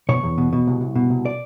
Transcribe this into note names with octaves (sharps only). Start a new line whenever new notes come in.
B2 C#5
E2
B2
B2
C2
C2
B2
C2
D5